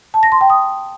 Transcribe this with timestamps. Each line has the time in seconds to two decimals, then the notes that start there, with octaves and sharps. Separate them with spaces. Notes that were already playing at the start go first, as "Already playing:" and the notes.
0.14 A5
0.23 A#6
0.32 C6
0.41 G5
0.50 D#6